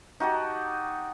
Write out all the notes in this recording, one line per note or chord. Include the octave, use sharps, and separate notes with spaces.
D#4 F#4 G4 A5